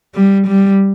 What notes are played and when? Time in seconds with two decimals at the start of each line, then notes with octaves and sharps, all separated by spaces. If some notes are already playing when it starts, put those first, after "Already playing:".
0.15 G3
0.47 G3